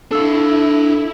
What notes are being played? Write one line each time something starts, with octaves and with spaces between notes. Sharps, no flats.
D4 E4 A4 F5 E6